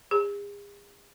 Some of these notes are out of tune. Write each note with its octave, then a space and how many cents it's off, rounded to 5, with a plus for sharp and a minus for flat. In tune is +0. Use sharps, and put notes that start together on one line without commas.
G#4 -40